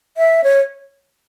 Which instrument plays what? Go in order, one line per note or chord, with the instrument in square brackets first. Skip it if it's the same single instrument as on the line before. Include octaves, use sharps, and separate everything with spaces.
[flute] E5
C#5